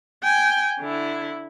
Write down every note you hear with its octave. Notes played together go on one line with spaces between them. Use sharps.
G5 G#5
D3 E4